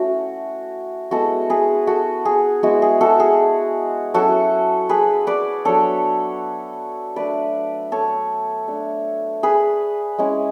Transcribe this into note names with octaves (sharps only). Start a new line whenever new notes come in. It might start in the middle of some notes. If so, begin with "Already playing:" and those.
Already playing: A3 C#4 E4 F#4
G#3 B3 E4 F#4 A4
G#4 B4
F#4 A4
G#4
G#3 B3 E4 F#4
G#4
F#4 A4
G#4
F#3 C#4 E4 F#4 A4
G#4 B4
B4 D5
F#3 B3 D4 A4 C#5
A3 D4 B4 D5
A4 C#5
A3 D4
G#4 B4
G#3 C#4 E4